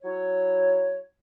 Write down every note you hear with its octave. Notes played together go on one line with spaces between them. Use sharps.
F#3 E4 C#5